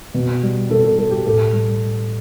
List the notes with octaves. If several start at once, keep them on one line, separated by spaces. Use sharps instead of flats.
B2
G3
B2 A4
A4
G3 A4
G4
A2 A4
G3